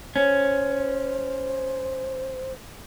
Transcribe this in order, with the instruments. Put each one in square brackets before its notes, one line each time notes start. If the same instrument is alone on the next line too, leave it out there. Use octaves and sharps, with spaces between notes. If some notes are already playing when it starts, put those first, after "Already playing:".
[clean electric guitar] C#4 [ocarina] C5